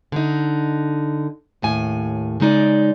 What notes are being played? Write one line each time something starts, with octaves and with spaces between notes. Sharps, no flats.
D3 D#4
D#2 A2 G#5
C#3 G#3 D#4 D5